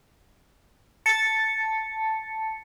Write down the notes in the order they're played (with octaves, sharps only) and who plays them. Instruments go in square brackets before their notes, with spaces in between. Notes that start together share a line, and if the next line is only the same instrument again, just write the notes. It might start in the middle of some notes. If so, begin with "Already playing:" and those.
[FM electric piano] A5 A6 [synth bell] C#7